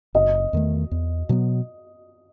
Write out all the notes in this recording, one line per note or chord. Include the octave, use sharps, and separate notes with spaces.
F#1 D#5
E2 D#3 A3
E2
B2 F#3 B3